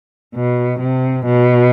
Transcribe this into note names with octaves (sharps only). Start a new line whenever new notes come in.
B2
C3
B2